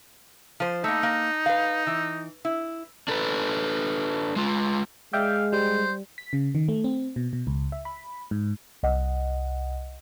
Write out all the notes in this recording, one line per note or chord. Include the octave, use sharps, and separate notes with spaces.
F3 C5
A3 A#3 D#4
A#3
B4 F5
E3
E4
D4 A4 B4
G#3 F4
G#3 D5 E5 F5 G5
G3 C5
B6
C#3
D#3
A3
C4
B2
B2
C#2
E5
B5
G#2
C2 D#5 F#5